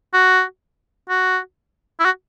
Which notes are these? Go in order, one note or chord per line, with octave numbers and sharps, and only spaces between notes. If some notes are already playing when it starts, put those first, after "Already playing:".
F#4
F#4
E4
F#4